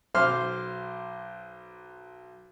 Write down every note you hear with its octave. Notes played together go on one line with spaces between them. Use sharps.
B1 C5 C6 D6 F6